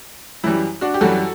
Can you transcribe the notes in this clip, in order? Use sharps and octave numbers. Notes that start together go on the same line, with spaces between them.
F#2 E3 G3 E4
D4 F#4
G4
F#2 E3 G3 F#4 A4